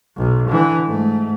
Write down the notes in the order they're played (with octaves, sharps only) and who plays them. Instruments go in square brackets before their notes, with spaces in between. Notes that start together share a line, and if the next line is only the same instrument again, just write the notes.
[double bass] B1
D3 E3
G#2 A3